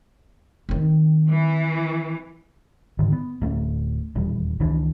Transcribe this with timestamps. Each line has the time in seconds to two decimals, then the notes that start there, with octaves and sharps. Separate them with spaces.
0.69 D#3 C4
1.30 E3
2.99 G#2 D3 D#3
3.12 B3
3.41 D1 A3 C#4
4.15 D#1 E2 G3
4.60 C#2 D#3 E3 D4